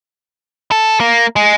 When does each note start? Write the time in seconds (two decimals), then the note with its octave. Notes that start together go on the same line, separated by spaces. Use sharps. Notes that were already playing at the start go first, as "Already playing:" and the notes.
0.72 A4
1.00 A#3
1.36 G#3